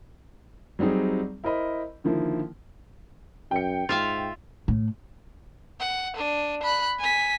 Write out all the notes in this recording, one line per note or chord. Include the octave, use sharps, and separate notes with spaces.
F#3 G3 C4 D#4 G#4
E4 A#4 C5 D#5 B5
D3 D#3 F3 A#3 E4
F#2 G5 C#7
G#2 F4 E5 F5
A2
F#5
D4 D#7
B5 F#6
G#5 B6